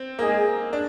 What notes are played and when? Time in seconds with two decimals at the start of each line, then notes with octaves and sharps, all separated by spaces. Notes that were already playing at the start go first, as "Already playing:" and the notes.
Already playing: C4
0.19 G#3 A#3 D#4 G#4
0.73 D4